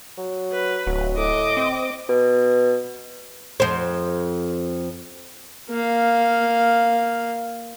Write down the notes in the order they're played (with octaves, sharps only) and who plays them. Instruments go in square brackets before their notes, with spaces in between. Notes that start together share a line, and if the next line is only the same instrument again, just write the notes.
[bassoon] F#3
[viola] B4
[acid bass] D1 [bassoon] F#3
[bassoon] A2 [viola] D#5 D6
[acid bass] C4
[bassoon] B2
[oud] F2 C5
[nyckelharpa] A#3 F5